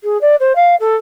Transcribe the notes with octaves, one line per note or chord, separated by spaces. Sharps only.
G#4
D5
C5
F5
A4